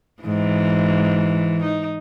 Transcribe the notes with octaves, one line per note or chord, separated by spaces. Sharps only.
G#2 E3
D#4